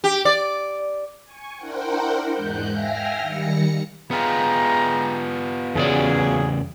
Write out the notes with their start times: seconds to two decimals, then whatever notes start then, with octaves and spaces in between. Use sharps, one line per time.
0.04 G4
0.25 D5
1.24 G#5 C#6
1.56 D4 E4 A#4 C5 F#5 G5
2.34 E2 G#2 G#3 F#6 G6
2.70 E5 F5 G5 G#5 F6 A#6
3.19 D#3 G3 A#6 C#7
4.11 G#3 B3 F4 G5 A#5
5.75 E2 C#3 F#3 C#4 G#4 D5